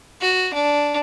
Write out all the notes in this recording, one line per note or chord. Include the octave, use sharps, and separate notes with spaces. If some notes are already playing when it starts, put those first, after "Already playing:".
F#4
D4